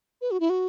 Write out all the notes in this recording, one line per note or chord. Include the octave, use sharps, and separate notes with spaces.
B4
F#4
E4
F#4